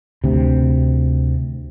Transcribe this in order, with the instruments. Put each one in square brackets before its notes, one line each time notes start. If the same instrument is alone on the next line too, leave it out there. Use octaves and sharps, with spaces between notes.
[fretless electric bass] D2 C3